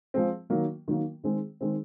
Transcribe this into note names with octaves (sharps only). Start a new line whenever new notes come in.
F3 G#3 C4
D#3 F#3 A#3
D#3 F#3 A#3
D#3 G#3 C4
D#3 G#3 C4